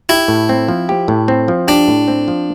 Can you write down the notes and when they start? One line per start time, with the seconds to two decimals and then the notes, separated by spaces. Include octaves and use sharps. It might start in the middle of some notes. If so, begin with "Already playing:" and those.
0.09 E4 G4
0.28 A2
0.49 C4
0.68 F3
0.89 G4
1.08 A2
1.28 C4
1.48 F3
1.68 D4 G4
1.88 A2
2.08 C4
2.28 F3